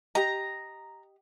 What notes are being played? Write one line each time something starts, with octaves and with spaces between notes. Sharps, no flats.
G4 D#5 A#5